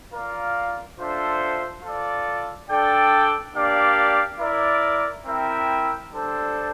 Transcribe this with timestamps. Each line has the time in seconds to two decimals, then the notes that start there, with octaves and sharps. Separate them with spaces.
0.13 F4 A#4 D5 F5
0.98 D4 F4 A4 C5 E5
1.83 F4 A4 D5
2.69 D4 A4 D5 G5
3.54 A#3 D4 G4 D5 F5
4.40 E4 A#4 D5
5.25 C4 E4 A#4 E5 G5
6.11 G3 D4 A4 C5